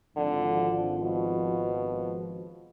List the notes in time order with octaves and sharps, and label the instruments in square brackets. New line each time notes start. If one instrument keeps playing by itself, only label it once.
[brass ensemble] G#1 F3 [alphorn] D3
[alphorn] B2